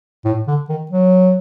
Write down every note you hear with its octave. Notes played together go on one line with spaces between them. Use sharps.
A2
D3
D#3
F#3